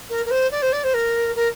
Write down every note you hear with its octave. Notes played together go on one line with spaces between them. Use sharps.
A#4
A#4
C5
D5
C5
D5
C5
A#4
A#4